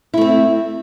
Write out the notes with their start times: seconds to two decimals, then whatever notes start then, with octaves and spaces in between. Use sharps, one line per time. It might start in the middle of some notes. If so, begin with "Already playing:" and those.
0.14 E4
0.17 A3
0.21 C4